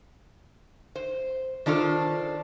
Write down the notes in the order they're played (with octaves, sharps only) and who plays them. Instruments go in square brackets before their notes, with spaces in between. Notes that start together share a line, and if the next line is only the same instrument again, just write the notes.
[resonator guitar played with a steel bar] C5
D#3 D4 F4 A4 C5